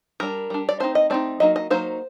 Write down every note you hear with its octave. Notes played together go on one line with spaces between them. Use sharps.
G3 D4 A#4
G3 D4
D5
A3 C4 D#4 C5
D#5
A3 C4 D#4 D5
F#3 A#3 D#4 D#5
D#5
F#3 A#3 D#4 C5